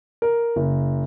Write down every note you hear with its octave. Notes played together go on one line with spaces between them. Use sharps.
A#4
F#1